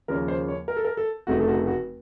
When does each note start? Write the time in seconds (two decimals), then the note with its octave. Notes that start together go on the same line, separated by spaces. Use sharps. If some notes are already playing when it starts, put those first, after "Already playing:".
0.08 D#2 C#3 F3 A#3 C#4 A#4
0.28 C5
0.48 C#5
0.68 A#4
0.76 A4
0.85 A#4
0.97 A4
1.27 F1 F2 C#3 A3 D#4 F#4
1.41 A4
1.48 F#4
1.67 F#4